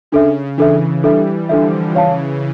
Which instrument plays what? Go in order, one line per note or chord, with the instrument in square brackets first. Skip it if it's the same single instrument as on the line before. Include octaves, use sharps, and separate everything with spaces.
[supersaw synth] C#3 [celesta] D4 A4 E5
[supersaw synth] C#3 E3 [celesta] D4 A4 E5
[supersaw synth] E3 G3 [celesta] D4 A4 E5
[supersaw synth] D3 F3 [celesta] D4 A4 E5
[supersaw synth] C#3 E3 [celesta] C#5 F5 A5